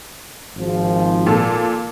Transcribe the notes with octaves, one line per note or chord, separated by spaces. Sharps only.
G#1 F3
A#2 A4